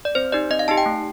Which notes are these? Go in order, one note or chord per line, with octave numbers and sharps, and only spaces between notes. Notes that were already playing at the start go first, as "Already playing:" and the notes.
D5
C4 C5
D#4 G4 D5
C4 D#5
F5
D#4 G4 A5
G5
A3